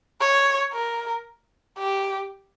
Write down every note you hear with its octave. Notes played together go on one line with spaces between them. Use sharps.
C#5
A#4
G4